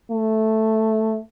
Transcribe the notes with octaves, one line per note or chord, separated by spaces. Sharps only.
A3